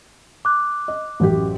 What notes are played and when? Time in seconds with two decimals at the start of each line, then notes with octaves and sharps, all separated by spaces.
0.45 D6 F#6
0.88 D#5
1.20 A1 F#2 G4